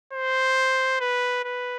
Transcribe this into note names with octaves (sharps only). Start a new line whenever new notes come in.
C5
B4
B4